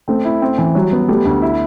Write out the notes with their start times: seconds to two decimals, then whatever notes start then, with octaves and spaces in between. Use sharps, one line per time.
0.08 A3 C4
0.25 E4
0.42 C4
0.58 E3
0.75 F#3 G3
0.92 B3
1.08 G3 A3
1.25 D2
1.42 E4